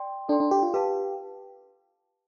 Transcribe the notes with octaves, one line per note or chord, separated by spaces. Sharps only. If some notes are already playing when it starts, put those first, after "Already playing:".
Already playing: D5 G5 C6
D4 A4 D5 G5 C6
D4
G4
F4
G4 B4 F5 A5